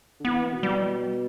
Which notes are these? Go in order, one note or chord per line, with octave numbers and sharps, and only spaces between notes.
D3
E3 B3
B2
G3